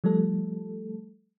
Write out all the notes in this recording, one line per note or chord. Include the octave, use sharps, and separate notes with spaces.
F3 G3 A3 A4